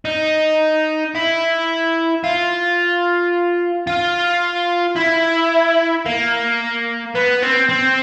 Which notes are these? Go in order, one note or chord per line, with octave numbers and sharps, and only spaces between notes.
D#4
E4
F4
F4
E4
A#3
B3
C4
C4